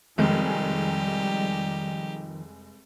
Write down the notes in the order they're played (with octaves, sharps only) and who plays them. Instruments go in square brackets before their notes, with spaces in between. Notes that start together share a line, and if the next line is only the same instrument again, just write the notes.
[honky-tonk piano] F1 G#3 [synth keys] D#3 F3 [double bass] G3 [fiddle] D#4 G4